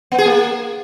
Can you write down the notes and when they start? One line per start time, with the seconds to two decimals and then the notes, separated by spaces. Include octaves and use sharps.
0.12 B3
0.18 G#4
0.25 A#3